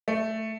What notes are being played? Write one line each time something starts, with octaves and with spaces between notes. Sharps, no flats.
A3